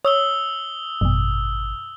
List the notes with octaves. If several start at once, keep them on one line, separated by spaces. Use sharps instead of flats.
C#5 D#6 E6 G7
G#1 F#2 B2